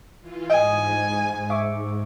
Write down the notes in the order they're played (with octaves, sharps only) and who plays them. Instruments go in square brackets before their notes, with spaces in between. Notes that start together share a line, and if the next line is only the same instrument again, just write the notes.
[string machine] E3 F4
[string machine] G#2 [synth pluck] D#5 D#6 [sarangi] G#5
[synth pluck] E5 C#6 D6